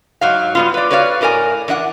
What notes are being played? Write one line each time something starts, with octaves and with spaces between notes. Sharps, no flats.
G#2 F#3 F5
G3 B3 F4
B4 D5
F#4 B4 C#5 D5 F5
A2 D4 A#4 D5 G#5
E3 D4 D#5 F#5